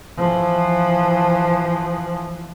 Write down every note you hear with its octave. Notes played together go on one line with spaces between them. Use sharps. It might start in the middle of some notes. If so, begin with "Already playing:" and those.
E3 F3